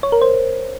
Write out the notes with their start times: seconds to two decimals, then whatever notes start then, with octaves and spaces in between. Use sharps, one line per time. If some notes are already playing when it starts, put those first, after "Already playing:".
0.03 C#5
0.12 A#4
0.22 C5